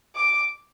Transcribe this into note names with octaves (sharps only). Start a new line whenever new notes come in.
D6